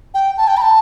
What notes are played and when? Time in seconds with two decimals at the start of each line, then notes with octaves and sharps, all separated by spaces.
0.14 G5
0.38 A5
0.48 G5
0.57 B5
0.62 A5